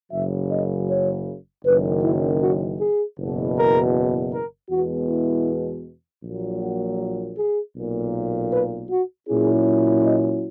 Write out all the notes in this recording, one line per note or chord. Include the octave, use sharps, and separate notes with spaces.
F#1 F#2 C#3 F#3 E5
D#5
C#5
F#1 F#2 D#3 B4
E4
F#4
G#4
F#1 E2 B2
A#4
A#4
E2 B2 G#3 B3 F#4
E4
A#1 A#2 F#3
F#4
G#4
B1 A#2 A#3
B4
F#4
A#2 F#3 C#4 E4 G#4
D#5